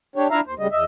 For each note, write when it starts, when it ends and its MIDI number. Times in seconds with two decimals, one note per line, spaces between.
0.16 0.28 62
0.16 0.28 67
0.16 0.28 73
0.30 0.41 62
0.30 0.41 64
0.30 0.41 65
0.30 0.41 76
0.30 0.41 77
0.30 0.41 82
0.47 0.55 39
0.47 0.55 72
0.59 0.67 38
0.59 0.67 49
0.59 0.67 55
0.59 0.67 56
0.59 0.67 75
0.72 0.84 40
0.72 0.84 75
0.72 0.84 76